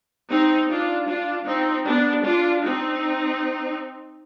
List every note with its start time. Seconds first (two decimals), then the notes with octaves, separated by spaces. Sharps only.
0.30 C4 D#4
0.69 D4 F4
1.07 D4 F4
1.47 C4 D#4
1.86 B3 D4
2.24 D4 F4
2.63 C4 D#4